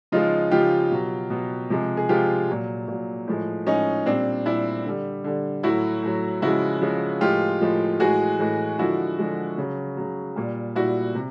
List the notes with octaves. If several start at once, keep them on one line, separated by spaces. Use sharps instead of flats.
C#3 F3 G#3 D#4 F4
C#3 F3 G#3 F4 G4
B2 F#3
B2 F#3
C3 F3 G#3
G#4
C3 F3 G#3 F4 G4
A#2 F#3
A#2 F#3
A2 F3 G#3
A2 F3 G#3 C#4 D#4
A#2 G3 C4 D4
A#2 G3 D4 E4
D3 G3
D3 G3
A2 F#3 E4 F#4
A2 F#3
C#3 F3 G#3 E4 F#4
C#3 F3 G#3
A2 F3 G#3 F4 G4
A2 F3 G#3
A2 E3 G#3 F#4 G#4
A2 E3 G#3
D3 F3 G#3 E4 F#4
D3 F3 G#3
C#3 F#3
C#3 F#3
A#2 G3
A#2 G3 E4 F#4
C3